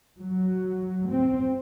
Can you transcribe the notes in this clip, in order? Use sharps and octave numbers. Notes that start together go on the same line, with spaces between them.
F#3
C4